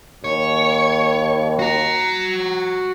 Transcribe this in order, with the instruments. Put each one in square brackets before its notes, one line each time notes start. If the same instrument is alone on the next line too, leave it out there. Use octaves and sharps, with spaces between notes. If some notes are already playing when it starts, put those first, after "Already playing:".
[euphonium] D#2 [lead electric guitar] C#5
[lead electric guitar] F#4 A#5